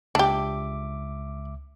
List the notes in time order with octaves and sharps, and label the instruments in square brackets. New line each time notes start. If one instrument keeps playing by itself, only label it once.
[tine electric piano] C#2 E5 D6 [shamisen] D4 G4